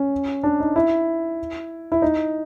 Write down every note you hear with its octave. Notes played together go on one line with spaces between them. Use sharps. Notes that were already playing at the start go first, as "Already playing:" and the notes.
Already playing: C#4
D4
D#4
E4
E4
D#4